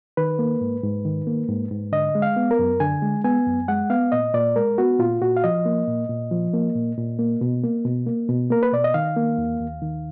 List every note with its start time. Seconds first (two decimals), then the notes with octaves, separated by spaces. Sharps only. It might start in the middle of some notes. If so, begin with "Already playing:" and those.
0.17 D#3 B4
0.39 A#3
0.61 G#2
0.83 G#2
1.05 D#3
1.27 A#3
1.49 G#2
1.71 G#2
1.92 D3 D#5
2.15 G#3
2.22 F5
2.36 B3
2.51 A#4
2.59 F#2
2.80 D3 G#5
3.02 G#3
3.24 B3 G#5
3.46 F#2
3.68 G#3 F#5
3.90 B3 F5
4.12 A#2 D#5
4.34 A#2 D5
4.56 G#3 A#4
4.78 B3 F#4
4.99 A#2 F4
5.22 A#2 F#4
5.37 F5
5.44 F3 D#5
5.65 A#3
5.87 A#2
6.09 A#2
6.31 F3
6.53 A#3
6.75 A#2
6.97 A#2
7.19 A#3
7.41 B2
7.63 A#3
7.85 B2
8.06 A#3
8.29 B2
8.50 A#3 A#4
8.63 B4
8.73 B2 D5
8.84 D#5
8.94 D#3 F5
9.16 A#3
9.38 D#2
9.60 D#2
9.82 D#3